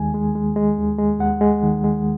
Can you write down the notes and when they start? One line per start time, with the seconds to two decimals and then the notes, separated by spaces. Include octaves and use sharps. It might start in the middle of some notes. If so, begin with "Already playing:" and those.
Already playing: D#2 D#3 G#3 G#5
0.14 G#3
0.35 G#3
0.56 G#3
0.78 D#2
0.98 G#3
1.20 D#2 F#5
1.41 G#3
1.63 D#3
1.84 G#3